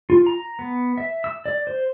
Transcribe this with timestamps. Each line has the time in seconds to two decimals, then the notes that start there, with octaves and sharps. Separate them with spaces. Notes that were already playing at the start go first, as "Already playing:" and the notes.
0.10 F4
0.27 A#5
0.59 B3
0.98 E5
1.24 E6
1.46 D5
1.67 C5